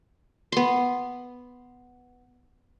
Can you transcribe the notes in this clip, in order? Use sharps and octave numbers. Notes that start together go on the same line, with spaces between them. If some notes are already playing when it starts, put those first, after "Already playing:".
B3 C6